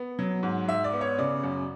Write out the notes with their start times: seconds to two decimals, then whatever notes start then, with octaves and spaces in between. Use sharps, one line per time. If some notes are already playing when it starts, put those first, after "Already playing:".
Already playing: B3
0.19 F#3
0.43 G#2
0.68 G#2 E5
0.84 D5
0.93 B3
1.01 C#5
1.18 C#3 D5
1.43 F#2